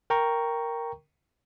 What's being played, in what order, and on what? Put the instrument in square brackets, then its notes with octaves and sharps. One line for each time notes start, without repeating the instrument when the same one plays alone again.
[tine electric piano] A#4 G5 A#5 C#6